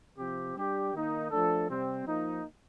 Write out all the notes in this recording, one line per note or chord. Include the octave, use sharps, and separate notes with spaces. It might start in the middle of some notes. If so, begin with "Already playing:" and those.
C3 F3 C4 G4
G3 D4 G4
D#3 A#3 D#4
F3 A3 D4 A4
C3 G3 C4
F3 A#3 D#4